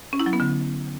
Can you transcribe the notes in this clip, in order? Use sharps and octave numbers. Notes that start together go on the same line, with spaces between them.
C#4
E4
F#3
B3
D3